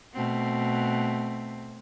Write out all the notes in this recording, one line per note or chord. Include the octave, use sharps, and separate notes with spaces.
B2 A3 C4